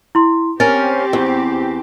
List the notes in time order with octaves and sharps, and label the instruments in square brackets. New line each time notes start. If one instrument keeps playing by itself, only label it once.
[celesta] E4 C6
[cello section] C4 G4 [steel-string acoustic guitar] C#4 A#4 [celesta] A6
[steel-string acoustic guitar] E2